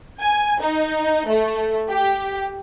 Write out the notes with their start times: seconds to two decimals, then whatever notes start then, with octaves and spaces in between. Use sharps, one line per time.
0.20 G#5
0.60 D#4
1.27 A3
1.89 G4